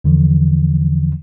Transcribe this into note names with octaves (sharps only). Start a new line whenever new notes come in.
E2 D3 E3 F3